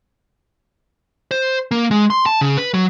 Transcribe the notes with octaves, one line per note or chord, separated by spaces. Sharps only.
C5
A#3
G#3
C6
A5
C#3
B4
F#3